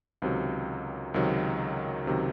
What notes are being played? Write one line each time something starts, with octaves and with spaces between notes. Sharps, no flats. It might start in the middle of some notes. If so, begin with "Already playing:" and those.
C#2 C3 D#3 F#3
C#2 C3 D#3 F#3
C#2 C3 D#3 F#3